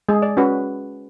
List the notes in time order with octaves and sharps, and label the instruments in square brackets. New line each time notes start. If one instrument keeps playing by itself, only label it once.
[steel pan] G#3 G#4
D5
C#4 F#4 B4